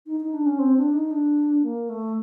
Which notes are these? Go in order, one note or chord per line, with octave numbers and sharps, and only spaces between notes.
D#4
D#4
D4
C#4
C4
D4
D#4
D4
A#3
A3